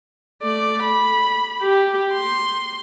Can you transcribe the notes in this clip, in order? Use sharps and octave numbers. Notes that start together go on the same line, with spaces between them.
A3 D5
B5
G4
C6